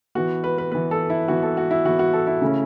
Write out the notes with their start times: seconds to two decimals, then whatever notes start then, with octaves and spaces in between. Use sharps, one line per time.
0.15 E3 B3 F#4
0.44 B4
0.58 B4
0.72 E3 B3 B4
0.91 A4
1.10 E4
1.28 E3 B3 F#4
1.43 A4
1.57 F#4
1.71 E4
1.85 E3 B3 F#4
1.99 F#4
2.13 A4
2.27 E4
2.41 C#3 A3 C#4